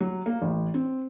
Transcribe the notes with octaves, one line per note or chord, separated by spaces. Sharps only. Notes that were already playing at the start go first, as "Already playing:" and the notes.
F#3
A#3
A1
C4